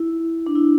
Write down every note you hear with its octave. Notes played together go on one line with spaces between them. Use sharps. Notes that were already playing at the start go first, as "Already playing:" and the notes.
Already playing: E4
D4
E4